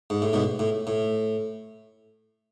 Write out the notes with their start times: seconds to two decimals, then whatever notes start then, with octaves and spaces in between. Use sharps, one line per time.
0.10 G#2
0.22 A2
0.33 G#2 B2
0.59 A2
0.87 A2